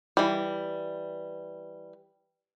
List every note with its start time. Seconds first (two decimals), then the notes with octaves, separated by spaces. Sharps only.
0.17 E3 G3